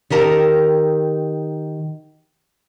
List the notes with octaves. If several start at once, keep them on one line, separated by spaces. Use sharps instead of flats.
D#3 G4 A#4 A5